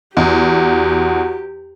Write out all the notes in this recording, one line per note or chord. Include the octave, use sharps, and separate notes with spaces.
E2 F#4 G4